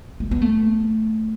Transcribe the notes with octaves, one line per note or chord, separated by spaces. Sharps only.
A3
B3
A3